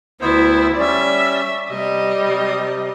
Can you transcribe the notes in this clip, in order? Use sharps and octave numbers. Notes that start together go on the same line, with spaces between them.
D2 B3 E4 C5
G3 C#4 D5 E5
C3 G3 D#5
C3